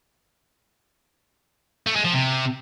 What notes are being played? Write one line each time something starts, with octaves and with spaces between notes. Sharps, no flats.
A3
G#3
F3
C3